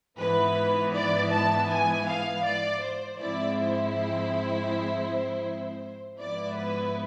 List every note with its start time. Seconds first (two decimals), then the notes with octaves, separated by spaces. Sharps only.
0.18 G#2 E3 B3 E4 B4
0.94 D5
1.32 A5
1.69 G#5
2.06 F5
2.44 D5
2.82 C5
3.18 G#2 F3 G#3 C4 E4 D5
3.56 C5
3.94 C5
6.19 G#2 F3 B3 E4 D5
6.56 B4